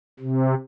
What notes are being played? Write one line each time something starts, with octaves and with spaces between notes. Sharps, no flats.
C3